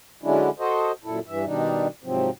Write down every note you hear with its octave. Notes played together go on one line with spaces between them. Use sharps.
D3 F#3 G#3 C#4 D4 E4
F#4 A4 C5 D#5
F#2 A#2 E4 A4
G2 E3 E5
B2 D#3 G3 D4 D#4
G#2 C3 F3 F#3 C4